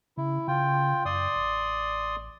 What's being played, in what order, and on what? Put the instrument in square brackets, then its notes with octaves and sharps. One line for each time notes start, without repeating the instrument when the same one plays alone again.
[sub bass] C#3 [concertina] E4
[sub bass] C#3 [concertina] F4 G5
[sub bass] F#2 [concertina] D5 C6 D#6
[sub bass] A1